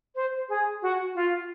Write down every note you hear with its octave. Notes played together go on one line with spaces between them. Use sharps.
C5
G#4
F#4
F4